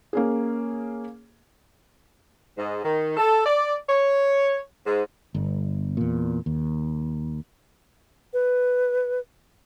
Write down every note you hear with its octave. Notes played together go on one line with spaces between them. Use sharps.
A#3 C#4 G#4
G#2
D#3
A4
D5
C#5
G#2
G1
E2 A#2
D#2
B4